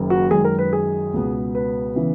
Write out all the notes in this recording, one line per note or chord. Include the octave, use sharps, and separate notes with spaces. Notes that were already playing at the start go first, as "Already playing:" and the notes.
Already playing: F#1 F#2 D#3 A#3
F#4
F#2 D#3 G#3 G#4
A#4
B4
G#4
C#2 B2 G#3 B3
B4
C#3 E3 B3